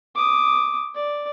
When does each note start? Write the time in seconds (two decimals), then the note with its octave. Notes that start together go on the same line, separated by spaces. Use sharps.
0.15 D6 D#6
0.95 D5